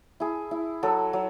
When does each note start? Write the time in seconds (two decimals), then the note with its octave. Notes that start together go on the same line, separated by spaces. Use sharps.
0.20 E4 G#4
0.51 E4
0.83 F#3 A4
1.13 F#3